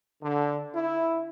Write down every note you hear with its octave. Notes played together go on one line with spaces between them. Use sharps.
D3
E4